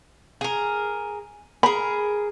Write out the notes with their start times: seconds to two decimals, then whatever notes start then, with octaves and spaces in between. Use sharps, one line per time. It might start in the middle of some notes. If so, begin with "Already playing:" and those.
0.41 G#4 A#4
1.63 G#4 A#4 B5